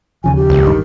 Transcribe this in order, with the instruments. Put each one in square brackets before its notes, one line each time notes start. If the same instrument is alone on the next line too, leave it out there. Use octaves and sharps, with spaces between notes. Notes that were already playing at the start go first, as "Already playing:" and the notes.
[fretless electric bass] D#2 C#3 F3 [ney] G#5
[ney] G4
[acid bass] C#2
[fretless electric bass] A1 G2 D#3